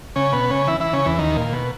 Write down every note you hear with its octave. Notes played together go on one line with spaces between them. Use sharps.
C#3 C#4
B2 B3
C#3 C#4
E3 E4
E3 E4
C#3 C#4
E2 E3
D#2 D#3
A#2
B2